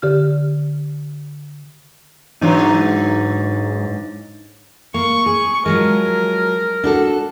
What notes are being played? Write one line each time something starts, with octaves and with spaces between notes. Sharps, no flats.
D3 G4 F6
G#2 D3 E3 F#3 D4 D#4
A#3 C#6
G#4
F3 F#3 G#3 A#4
D4 F#4 A4